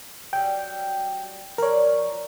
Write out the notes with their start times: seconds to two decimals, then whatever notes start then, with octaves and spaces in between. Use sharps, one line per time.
0.33 F#3 G3 G5
1.58 F3 A#4 C#5 D5